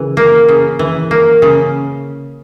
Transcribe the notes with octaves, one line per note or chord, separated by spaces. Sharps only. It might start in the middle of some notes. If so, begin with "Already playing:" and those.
Already playing: C#3 E3
A#3
C#3
E3
A#3
C#3